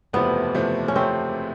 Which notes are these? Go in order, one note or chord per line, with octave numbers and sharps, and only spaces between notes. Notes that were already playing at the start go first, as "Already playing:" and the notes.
F#1 E2 C3 F3 A3 B3
F#1 E2 C3 F3 A3
C#4
C3 F3 A3 C4